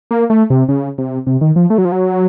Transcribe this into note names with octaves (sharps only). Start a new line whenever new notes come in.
A#3
A3
C3
C#3
C3
C3
D#3
F3
A3
F#3
F3
F#3